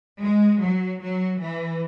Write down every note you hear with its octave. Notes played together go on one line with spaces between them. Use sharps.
G#3
F#3
F#3
E3